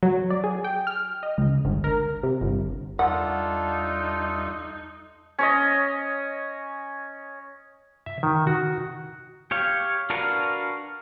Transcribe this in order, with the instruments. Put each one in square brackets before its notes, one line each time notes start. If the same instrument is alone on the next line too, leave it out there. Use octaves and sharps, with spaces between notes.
[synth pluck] F#3
D5
G#4
G5
F6
D#5
C#2
G1
A#4
C3
G1
[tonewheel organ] E2 G3 E5 [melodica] D4 F4 A4 [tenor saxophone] D#4 [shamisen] F#5
[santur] C#4 C#5 D#5
[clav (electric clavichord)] E5
D#3
F#4
[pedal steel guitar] G4 C#5 F5
D4 F#4 A#4 B4 F5